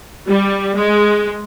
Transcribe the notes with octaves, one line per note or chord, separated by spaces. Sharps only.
G3
G#3